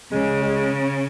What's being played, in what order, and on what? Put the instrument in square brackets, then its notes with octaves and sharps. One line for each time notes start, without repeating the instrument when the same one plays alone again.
[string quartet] C#3 [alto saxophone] G#3
[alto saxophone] G#3